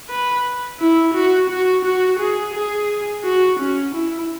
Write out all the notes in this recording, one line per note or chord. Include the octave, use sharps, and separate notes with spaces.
B4
E4
F#4
F#4
F#4
G#4
G#4
F#4
C#4
E4